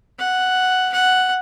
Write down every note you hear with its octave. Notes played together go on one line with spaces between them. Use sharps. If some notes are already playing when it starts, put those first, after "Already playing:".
F#5
F#5